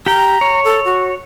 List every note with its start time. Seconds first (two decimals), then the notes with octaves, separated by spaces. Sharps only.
0.06 G4 G5 A#5
0.41 C#5
0.65 A4
0.85 F#4